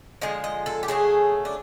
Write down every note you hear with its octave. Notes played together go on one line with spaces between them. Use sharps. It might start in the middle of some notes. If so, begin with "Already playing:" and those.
D3 F3 G#3 D#5
D#5
A4
G4
C#3 F#3 A3 G#4
D4